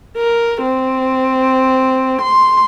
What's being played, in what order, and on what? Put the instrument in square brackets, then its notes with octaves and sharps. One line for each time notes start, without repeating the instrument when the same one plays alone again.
[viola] A#4
C4
C6